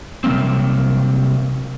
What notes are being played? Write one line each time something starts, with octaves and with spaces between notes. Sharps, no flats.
C3 F#3 G3 A#3 C4